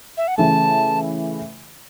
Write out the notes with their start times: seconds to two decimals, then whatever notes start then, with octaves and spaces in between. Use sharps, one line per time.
0.17 E5
0.28 F#5
0.37 C#3 E3 A3 A5